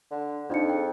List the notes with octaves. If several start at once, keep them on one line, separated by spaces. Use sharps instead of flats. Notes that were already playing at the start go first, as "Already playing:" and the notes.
D3
F2 D4 D#4 C#7
G#4 G5